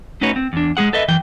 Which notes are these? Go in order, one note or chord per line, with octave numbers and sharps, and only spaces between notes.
A3 C#4 D#4 F#4 B4 C#5
C4
E2 D4
G#3 A3 G#4 F#5
A4 B4 D#5 E5
F#2 E3 G5